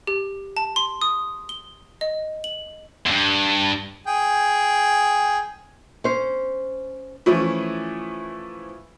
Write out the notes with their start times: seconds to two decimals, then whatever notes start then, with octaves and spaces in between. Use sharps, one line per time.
0.07 G4
0.57 A5
0.76 C6
1.01 D#6
1.49 G7
2.01 D#5
2.44 F#7
3.06 E2 G2
4.07 G#4 G5
6.04 C#4 C5
7.26 E3 F3 A3 C#4 E4